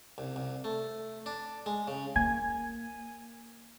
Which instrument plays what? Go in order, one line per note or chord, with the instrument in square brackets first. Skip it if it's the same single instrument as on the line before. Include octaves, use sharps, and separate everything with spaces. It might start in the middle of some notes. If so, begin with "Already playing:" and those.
[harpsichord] C2
C2
A3
D4
G#3
C#3
[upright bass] A#3 [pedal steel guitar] G#5